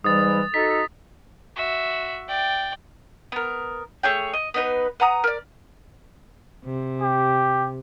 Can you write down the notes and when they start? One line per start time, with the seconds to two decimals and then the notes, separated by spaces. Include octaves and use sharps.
0.04 G#2 E3 G3 D#6 A6
0.54 D#4 F#4 A4 B6
1.56 F#4 E5
2.28 D5 G5
3.32 B3 A#4
4.03 A3 G#4 C#5 G5
4.33 D#5
4.54 B3 D#4 B4
5.00 B4 F#5 A#5 D#6
5.24 A#4 D5
6.65 C3
7.02 G4